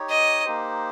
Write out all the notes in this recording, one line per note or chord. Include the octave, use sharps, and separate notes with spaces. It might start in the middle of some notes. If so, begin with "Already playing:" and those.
Already playing: D#4 G4 C#5
D#5
A#3 D#4 G4 C5